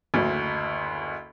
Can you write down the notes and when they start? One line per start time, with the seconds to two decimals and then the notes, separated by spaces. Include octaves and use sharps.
0.14 F#1 D2